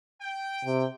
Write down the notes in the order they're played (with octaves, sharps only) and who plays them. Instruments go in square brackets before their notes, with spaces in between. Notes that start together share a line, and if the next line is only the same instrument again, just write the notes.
[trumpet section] G5
[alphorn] C3